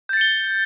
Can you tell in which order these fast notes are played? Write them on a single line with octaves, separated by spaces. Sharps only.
G6 A6 C#7 G7